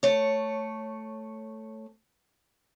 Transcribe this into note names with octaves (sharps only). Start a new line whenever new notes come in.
A3 C#5